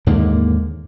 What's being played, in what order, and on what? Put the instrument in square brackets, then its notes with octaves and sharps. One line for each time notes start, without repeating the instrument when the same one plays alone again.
[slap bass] D#2 G#2 D3 A#3